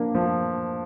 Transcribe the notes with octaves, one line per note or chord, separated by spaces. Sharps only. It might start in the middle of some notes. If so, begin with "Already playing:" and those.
Already playing: F3 A#3 D4
F3